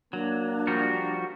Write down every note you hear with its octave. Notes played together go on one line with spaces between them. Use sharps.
F#3 A#3 D4
F3 G3 F#4 A#4